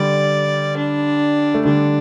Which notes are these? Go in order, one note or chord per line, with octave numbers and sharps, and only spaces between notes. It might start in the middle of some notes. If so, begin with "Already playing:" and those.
Already playing: D3 G3 D5
D4
A3
D3 G3 D4